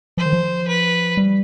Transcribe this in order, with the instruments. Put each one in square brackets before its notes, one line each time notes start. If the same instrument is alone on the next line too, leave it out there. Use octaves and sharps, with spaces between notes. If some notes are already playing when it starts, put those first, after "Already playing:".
[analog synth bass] F3 [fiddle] C5
[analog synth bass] D#3
F3
[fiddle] B4
[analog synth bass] G3